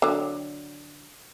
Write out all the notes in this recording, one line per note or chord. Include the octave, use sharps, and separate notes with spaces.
D3 F#3